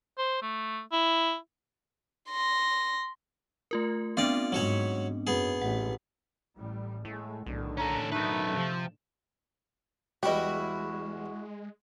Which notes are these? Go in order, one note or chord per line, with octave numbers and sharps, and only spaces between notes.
C5
A3
E4
C6 A#6
A3 F4 A#4
B3 C4 D4 F4 D5
G#2 F#3 F#4 C#5
F#2 B3 G#4
A1 F#5
A1 A2 G3
A2 G#3 A3
B1 A2 D3 D#3
C#4 A4 A#5
F#2 A3 D#4 B4
C3 F3
E2 G3 G#3 E4 F#4 G4 D#5 G5